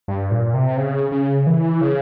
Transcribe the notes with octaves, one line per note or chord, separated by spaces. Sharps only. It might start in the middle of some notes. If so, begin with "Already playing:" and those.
G2
A#2
C3
C#3
C#3
E3
C#3